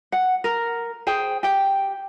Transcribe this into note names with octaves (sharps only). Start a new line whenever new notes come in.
F#5
A#4
G#4 C5 G5
G4 G5